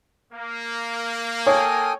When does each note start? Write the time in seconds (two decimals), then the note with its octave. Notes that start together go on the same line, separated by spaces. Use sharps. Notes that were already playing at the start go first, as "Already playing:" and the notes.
0.32 A#3
1.47 A4 C#5 G5 G#5 D#6